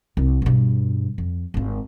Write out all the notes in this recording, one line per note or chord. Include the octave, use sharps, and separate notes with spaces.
C2
G2 B2
F2
G#1 F4